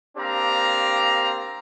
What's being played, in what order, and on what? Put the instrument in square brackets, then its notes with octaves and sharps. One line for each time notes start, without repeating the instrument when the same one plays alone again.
[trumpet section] A#3 C4 D4 G4 F5 A#5